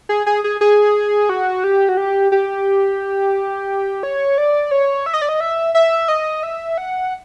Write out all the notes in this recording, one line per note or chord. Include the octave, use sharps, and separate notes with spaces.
G#4
G#4
G#4
G#4
F#4
G4
F#4
G4
G4
C#5
D5
C#5
E5
D#5
D5
D#5
E5
E5
D#5
E5
F#5